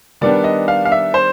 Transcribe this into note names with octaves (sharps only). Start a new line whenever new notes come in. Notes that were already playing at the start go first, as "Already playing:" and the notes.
D#3 G3 B3 D4 D5
D#5
F5
F5
E5
C5